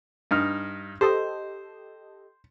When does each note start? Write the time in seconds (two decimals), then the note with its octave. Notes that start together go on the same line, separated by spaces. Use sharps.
0.31 G2 D#4 F6
1.01 G4 A4 C5 D#5